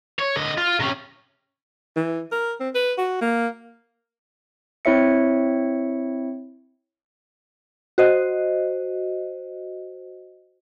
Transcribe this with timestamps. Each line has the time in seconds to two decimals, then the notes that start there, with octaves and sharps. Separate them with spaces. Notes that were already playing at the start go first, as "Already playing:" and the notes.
0.19 C#5
0.36 D3 D#5
0.58 F4
0.80 C3 C#4
1.96 E3
2.32 A#4
2.60 C4
2.75 B4
2.98 F#4
3.21 A#3
4.85 C4 E4 C#5 E5 C#7
7.98 F#4 C5 D#5